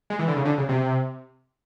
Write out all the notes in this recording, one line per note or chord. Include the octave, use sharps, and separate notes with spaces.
G#3
E3
D3
C#3
D3
C#3
C3